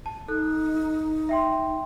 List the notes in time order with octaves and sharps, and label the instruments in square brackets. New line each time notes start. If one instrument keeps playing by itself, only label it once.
[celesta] A5
[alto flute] D#4 [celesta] A4 F#6
[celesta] E5 G5 C6